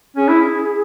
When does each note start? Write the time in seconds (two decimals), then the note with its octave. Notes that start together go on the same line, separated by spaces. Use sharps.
0.16 C#4 G#4
0.29 E4